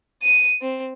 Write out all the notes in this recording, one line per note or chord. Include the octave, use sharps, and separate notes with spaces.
D#7
C4